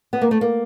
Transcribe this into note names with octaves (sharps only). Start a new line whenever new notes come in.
B3
A#3
A3
A#3